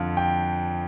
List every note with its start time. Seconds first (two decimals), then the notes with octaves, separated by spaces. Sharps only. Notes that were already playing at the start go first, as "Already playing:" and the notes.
Already playing: F2 D3 F5
0.17 G5